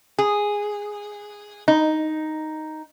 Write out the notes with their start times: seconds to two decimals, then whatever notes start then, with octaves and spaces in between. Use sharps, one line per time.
0.19 G#4
1.68 D#4